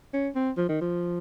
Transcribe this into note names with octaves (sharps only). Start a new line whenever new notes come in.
C#4
C4
F3
D#3
F3